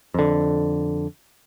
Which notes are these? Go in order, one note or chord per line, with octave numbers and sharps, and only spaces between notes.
F2 D3